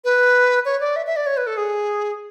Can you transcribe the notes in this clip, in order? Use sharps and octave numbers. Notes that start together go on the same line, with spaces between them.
B4
C#5
D5
E5
E5
D5
C#5
B4
A4
G#4